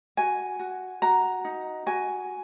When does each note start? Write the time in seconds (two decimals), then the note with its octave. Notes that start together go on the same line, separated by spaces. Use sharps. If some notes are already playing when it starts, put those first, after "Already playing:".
0.17 F#4 G#5
0.59 F#4
1.02 F#4 A#5
1.45 D#4
1.86 F#4 G#5